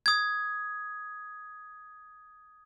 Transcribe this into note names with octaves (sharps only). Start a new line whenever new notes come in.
D#6 G#6